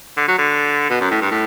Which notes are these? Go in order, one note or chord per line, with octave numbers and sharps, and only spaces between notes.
D3
F#3
D3
B2
F#2
A2
G2
A2